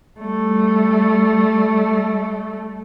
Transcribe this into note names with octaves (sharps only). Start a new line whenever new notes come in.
G3 A3